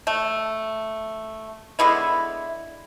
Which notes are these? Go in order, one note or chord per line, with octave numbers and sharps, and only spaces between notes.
A3
D3 G#3 B3 E4